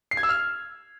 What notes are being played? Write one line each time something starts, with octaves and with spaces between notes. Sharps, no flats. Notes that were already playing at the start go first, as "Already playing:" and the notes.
C7
G#6
E6
F6